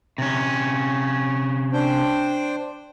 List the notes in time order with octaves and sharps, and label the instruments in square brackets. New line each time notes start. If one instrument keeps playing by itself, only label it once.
[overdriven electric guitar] C3 C#4
[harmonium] D4 C5 G5